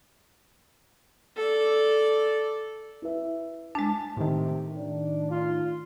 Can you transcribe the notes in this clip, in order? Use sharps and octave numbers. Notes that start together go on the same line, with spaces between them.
A4 D5
E4 B4 E5
G#3 D4 A5
A2 C3 D#3
D4
F4